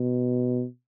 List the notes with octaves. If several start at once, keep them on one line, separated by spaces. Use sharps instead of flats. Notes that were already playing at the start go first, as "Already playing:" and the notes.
Already playing: B2